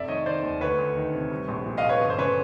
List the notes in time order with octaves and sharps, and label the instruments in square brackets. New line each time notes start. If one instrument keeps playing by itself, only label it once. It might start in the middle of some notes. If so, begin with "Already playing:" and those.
Already playing: [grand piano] F1 D5 E5
D#3 C#5 D#5
D#3 C5 D5
D#2
D2 B4 C#5
D2
D#3
C3
G3
A#1
A#2
D#5 F5
A#1
B4 C#5
G1
C5
C#3 B4 C#5